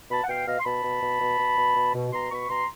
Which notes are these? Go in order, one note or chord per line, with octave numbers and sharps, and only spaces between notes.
B2 A5 B5
F#5
B2 F5 G5
B2 D#5 F5
C6
B2 A5 B5
B2
B2
B2
B2
B2
B2
B2
B2 A#5 C6
B2 B5 C#6
B2 A#5 C6